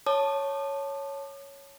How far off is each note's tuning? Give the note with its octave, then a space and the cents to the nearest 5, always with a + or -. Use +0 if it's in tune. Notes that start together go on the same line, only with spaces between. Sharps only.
C#5 +0 A5 +0 D6 +45